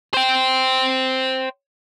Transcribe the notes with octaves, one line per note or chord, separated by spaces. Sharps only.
C5 G5